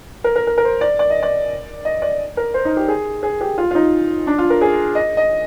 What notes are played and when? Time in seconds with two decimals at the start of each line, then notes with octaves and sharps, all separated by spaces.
0.24 A#4
0.36 A#4
0.47 A#4
0.58 A#4
0.64 C5
0.81 D5
0.99 D5
1.10 D#5
1.23 D5
1.85 D#5
2.02 D5
2.37 A#4
2.54 C5
2.65 D#4
2.77 G4
2.88 G#4
3.23 G#4
3.41 G4
3.58 F4
3.71 F4
3.75 D#4
4.27 D4
4.38 F4
4.50 A#4
4.61 G#4
4.95 D#5
5.17 D#5